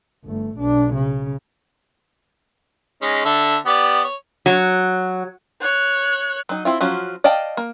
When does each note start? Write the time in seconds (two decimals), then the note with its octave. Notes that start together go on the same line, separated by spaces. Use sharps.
0.25 G1 A3
0.57 B1 D4
0.94 C#3
3.02 G#3 C#4 D#4
3.25 D3 A4 E5
3.66 B3 G4 D5
4.04 C#5
4.46 F#3
5.61 C#5 F#6
6.49 F#3 D#4
6.65 C4 E4 F4
6.80 F3 F#3 C#4 F4 F#4
7.24 D5 D#5 F5 G5 A5
7.57 A#3